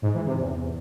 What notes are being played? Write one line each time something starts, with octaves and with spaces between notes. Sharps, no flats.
G#2
E3
C3
E2